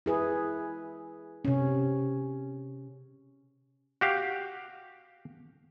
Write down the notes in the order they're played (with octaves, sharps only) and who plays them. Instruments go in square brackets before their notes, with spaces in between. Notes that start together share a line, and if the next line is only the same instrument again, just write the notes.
[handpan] E4 G#4 B4
C3 C#4
[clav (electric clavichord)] F#4 G4 F5